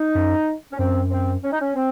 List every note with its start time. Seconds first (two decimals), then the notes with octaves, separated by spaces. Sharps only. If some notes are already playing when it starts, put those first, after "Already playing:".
Already playing: D#4
0.15 F#2
0.72 C#4
0.79 F#2 C4
1.11 C4
1.44 C#4
1.52 D#4
1.61 C#4
1.76 C4